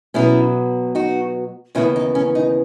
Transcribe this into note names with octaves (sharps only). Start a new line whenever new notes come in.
B2 F#3 B3 C#4 E4
D#4 F#4
D#2 C#3 E3 B3 C#4 E4
D#4
C#4
D#4